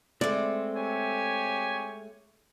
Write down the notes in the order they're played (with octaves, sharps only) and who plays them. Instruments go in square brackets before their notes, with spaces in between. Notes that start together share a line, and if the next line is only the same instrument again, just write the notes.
[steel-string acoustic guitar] G#3 A3 [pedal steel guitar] C4 [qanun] D5
[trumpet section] G4 C#5 G#5